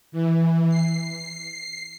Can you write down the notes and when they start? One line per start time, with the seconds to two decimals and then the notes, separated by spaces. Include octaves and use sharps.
0.12 E3
0.69 C7